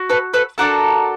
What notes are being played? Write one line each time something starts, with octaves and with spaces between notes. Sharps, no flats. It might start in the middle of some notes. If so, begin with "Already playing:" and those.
Already playing: F#4
A4 B4
A4 B4
D4 F#4 A4 A#4